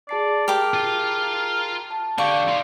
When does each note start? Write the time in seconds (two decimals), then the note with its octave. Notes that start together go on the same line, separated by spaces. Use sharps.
0.09 G#4 D5 A5 C7
0.48 G4 A#4 D6
0.74 F4
1.91 A5
2.18 D3 G4 D5 F5 C#6
2.48 D#4 F5 C6